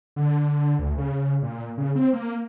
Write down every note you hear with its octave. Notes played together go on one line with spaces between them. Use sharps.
D3
D2
C#3
A#2
C#3
C4
A#3